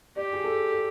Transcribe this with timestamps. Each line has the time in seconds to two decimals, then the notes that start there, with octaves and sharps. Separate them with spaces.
0.16 G4 D5
0.33 G#4
0.44 A4
0.72 A4